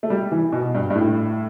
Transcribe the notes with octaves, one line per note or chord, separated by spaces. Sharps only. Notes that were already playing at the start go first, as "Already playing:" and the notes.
A3
G3
E3
B2
G2
G2
A2